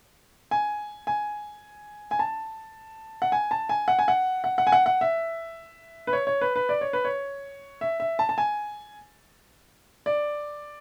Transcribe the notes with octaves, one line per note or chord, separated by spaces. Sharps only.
G#5
G#5
G#5
A5
F#5
G#5
A5
G#5
F#5
G#5
F#5
F#5
F#5
G#5
F#5
F#5
E5
B4
C#5
C#5
B4
B4
D5
C#5
B4
C#5
E5
E5
A5
A5
G#5
D5